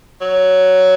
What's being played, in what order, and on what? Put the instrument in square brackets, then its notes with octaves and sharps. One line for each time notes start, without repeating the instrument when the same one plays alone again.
[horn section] F#3